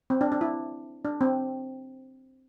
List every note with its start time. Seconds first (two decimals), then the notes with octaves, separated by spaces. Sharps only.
0.10 C4
0.21 D4
0.32 D4
0.41 E4
1.05 D4
1.21 C4